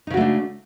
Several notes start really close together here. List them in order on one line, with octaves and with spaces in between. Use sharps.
D#4 C#3 F#4 A3 D4